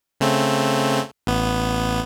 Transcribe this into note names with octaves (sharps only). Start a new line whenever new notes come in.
C#3 A3 C4
A1 B3